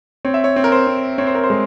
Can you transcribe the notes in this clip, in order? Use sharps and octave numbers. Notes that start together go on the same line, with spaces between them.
C4 C#5
E5
C#5
C4
A#4
C5
C4
C4 C#5
C5
A#4
C5
G#3